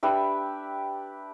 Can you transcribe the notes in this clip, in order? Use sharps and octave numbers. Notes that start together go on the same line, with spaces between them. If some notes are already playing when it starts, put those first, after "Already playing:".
D4 G4 B4 E5